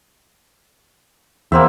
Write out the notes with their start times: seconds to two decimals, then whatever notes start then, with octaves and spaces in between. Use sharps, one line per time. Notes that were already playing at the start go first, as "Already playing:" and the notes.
1.52 E2 A#3 C4 E5